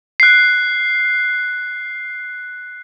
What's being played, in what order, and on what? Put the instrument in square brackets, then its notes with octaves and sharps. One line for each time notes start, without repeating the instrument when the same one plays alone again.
[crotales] F#6 C7